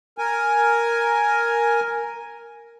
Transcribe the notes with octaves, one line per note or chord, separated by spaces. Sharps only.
A#4 G#5